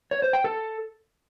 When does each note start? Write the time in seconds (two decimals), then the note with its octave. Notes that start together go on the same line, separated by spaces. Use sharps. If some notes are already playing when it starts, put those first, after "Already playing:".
0.11 C#5
0.22 C5
0.33 G5
0.44 A4